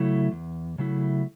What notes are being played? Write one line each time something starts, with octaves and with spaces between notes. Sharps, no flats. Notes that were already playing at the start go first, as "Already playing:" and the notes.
Already playing: C#3 F#3 A3 E4
E2
C#3 F#3 A3 E4